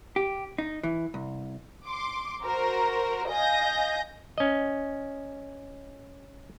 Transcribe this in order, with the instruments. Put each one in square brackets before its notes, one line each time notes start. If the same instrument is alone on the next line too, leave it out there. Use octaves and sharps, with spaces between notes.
[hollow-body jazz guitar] G4
D#4
E3
C2
[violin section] C6 D6
F#4 A#4 C5
D#5 F5 G#5 G6 A#6
[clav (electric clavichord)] C#4 D#5